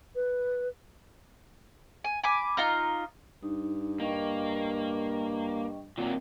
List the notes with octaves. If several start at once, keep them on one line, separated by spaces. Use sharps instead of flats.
B4
G#5
G#5 B5 D6
D#4 F4 A#5 F6
G2 D#4
A#3 D#5 G5 C#6
A#2 D#3 F#3 A#3 C4